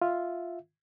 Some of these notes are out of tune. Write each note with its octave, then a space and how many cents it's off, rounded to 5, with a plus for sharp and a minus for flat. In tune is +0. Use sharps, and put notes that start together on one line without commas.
F4 +0 E5 +0